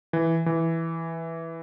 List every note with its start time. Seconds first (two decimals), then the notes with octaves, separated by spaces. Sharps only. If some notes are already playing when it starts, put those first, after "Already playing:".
0.13 E3
0.46 E3